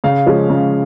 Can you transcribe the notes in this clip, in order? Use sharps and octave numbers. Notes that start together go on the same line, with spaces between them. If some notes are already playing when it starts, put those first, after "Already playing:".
C#3 F5
F3 G#3 C#4
C#3